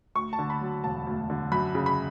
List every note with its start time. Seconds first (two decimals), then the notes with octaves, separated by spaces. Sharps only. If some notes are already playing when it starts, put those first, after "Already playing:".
0.15 D2 C#6
0.33 A5
0.39 D3
0.50 B5
0.61 F#3
0.84 E1 A5
1.07 D2
1.30 D3
1.52 F#2 B5
1.75 C#3
1.86 B5